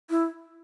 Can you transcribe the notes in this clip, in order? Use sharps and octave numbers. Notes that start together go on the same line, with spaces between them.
E4